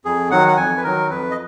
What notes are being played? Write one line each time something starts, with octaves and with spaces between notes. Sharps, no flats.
F2 G#4
D#3 F#3 F#5
F#5
F2 G#5
B4
D#3 F#3 A#4
F2 B4
D#5